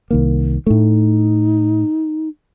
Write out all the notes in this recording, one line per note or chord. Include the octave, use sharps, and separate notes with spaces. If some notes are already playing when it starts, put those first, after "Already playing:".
C2 D#3 A#3
A2 A3 D#4